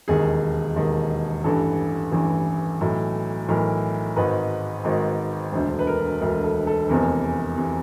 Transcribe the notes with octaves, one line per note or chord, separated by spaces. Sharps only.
E1 D#2 D#3 G#4
E1 D#2 D#3
A1 G2 E3 A4
A1 G2 E3
B1 A2 E3
B1 A2 E3 A#4
G#1 G#2 D#3 B4
G#1 G#2 D#3
E1 D2 D3 C5
B4
A#4
E1 D2 D3 A#4
A4
A4
F1 E2 C3 E3 A#4
C3 E3